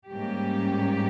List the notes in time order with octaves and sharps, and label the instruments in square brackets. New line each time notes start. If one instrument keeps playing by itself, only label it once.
[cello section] G#2 G3 A#3 C#4 G4